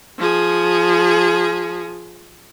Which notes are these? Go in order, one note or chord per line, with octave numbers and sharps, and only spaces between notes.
F3 G#4